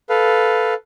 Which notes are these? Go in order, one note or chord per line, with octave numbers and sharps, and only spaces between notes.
A4 B4 F5